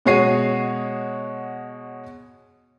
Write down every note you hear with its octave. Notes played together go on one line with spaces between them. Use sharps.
B2 G#3 F#4 C#5 C7 D#7